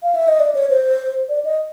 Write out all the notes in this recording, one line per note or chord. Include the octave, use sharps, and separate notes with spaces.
F5
E5
D#5
D5
C#5
C5
D5
D#5